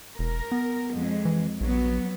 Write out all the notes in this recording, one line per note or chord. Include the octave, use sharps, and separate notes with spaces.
E1 A#4
B3
F2 G#3
E3
A#1 F#3 B3